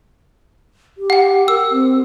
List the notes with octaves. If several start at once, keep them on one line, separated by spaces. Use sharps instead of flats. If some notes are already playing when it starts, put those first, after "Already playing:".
G4
F#5 G5
A#4 E6
C4